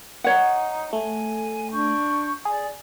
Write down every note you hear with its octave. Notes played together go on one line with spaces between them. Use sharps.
D#4 C#5 F#5
A3 G#5
D4 C#6 G6
G#4 D5